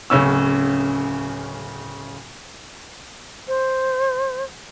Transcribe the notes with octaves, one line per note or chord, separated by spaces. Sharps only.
D1 C#3 C#4 E6
C5